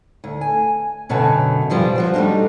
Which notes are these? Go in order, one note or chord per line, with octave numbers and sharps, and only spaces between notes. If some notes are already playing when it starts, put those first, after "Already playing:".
D2
G#5
F#2 B2 D3 C#4 G5 A5
G2 C#3 F3 G3
F3 F#4 C5
G3 A3 A#3 D4 D#4